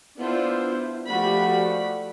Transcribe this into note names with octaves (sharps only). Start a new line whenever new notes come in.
B3 D4 E4 F4 C5
F3 A3 F#4 G4 D5 B5